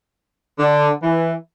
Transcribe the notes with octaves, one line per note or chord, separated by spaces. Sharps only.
D3
E3